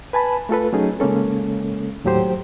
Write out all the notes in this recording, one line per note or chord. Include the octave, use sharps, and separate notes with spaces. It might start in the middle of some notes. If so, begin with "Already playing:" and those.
B4 G#5 A5 B5
A3 F4 A4 B4
F#3 A3 C#4 D#4 G#4
C#3 G#3 A#3 C#4 A4
D#2 A2 F#3 G4 C5